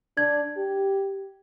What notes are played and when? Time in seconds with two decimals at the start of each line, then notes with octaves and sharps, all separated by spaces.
0.17 D4 G#6
0.57 G4